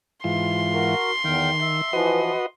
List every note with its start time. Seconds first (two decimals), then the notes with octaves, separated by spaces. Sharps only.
0.24 G#2 E3 F4 C6
0.74 F#4 A#4
1.24 E2 D#3 F5 G5
1.61 E5
1.93 E3 F3 F#4 B4 D#5